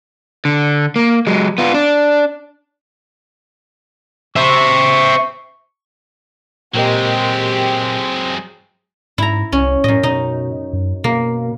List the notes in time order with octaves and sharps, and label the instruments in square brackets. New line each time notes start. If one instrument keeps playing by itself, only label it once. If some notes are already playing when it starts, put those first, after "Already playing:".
[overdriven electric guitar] D3
A#3
F#3 G#3
B3 F4
D4
[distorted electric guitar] C5 E5 [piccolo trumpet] C#6
[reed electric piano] A#2 A#4 D#5 [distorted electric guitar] F#3 G#3 [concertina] C4 [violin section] G4
[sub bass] G#2 [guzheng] E4 A#5
[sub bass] C2 [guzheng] C#4
[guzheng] F#2 D#5 [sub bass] A2
[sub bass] B2 [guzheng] D#4
[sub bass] F#2
[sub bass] B2 [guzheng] A#3